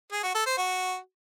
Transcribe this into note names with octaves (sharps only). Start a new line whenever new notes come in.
G#4
F#4
A4
C5
F#4